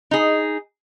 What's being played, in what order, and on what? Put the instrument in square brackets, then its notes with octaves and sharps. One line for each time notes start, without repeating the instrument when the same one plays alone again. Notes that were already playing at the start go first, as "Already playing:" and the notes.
[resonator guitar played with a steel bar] D#4 G#4